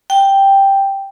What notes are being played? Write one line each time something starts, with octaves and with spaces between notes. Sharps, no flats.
G5